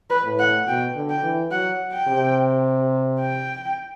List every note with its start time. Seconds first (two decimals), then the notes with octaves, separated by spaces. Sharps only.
0.10 B4
0.25 A2
0.39 F#5
0.67 B2 G5
0.95 D3
1.10 G5
1.23 E3
1.51 F#3 F#5
1.93 G5
2.07 C3
3.20 G5